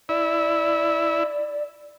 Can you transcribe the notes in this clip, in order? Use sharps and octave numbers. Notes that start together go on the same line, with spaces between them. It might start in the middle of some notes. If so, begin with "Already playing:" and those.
E4 D5